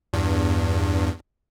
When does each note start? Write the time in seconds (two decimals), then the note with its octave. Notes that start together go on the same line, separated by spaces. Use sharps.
0.13 E2 G2